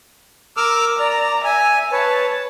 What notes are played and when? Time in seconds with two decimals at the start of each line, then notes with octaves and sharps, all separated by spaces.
0.57 A#4 D6 E6 F6
0.99 D5 A#5
1.44 E5 G#5
1.92 B4 C#5 A5